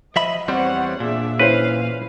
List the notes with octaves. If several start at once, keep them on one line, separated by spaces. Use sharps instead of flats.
F3 D#5 E5 B5
E2 G3 C4 C5 C#5 F#5
A#2 D4 G#4 E5
E3 C#4 E4 B4 C5 F5